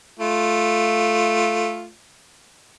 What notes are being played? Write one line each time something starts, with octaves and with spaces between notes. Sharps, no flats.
A3 F4